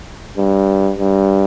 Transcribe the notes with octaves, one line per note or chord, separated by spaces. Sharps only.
G2
G2